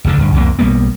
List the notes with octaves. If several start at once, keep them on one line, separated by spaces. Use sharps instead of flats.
F#1 D2 B2 D3
D1 G2
C2 F2 G#2 A#3
B1 G3 A#3 B3